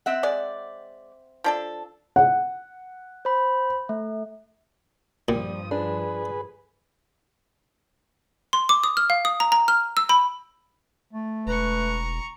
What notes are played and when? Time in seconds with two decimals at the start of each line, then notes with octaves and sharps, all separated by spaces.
0.06 C4 E5 F#5
0.23 G#3 D5
1.44 F3 D4 A4
2.16 F#5
3.25 C5 B5
3.89 A3
5.28 G2 A#2 F3 G3 D#6
5.71 D4 G#4 B4
8.53 C6
8.69 D6
8.84 D#6
8.97 F6
9.10 F5
9.25 D#6
9.40 A#5
9.52 A#5
9.68 F6
9.97 E6
10.09 B5
11.13 A3
11.47 E1 B4 A#5 C#6